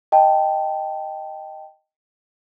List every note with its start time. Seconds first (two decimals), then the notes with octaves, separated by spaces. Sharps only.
0.12 D#5 G5 A5